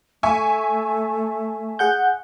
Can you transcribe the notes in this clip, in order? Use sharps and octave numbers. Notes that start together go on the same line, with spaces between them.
A3 E5 G#5 C#6
G#4 F#5 G6